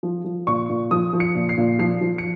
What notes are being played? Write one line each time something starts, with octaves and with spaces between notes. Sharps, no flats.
F3
F3
A#2 C#6
A#2
F3 D#6
F3
C#7
A#2
C7
A#2
F3 C7
F3
C#7